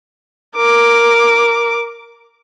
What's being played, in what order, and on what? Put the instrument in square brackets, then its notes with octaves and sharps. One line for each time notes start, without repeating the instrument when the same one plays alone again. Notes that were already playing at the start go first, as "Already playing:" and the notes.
[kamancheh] A#4 D6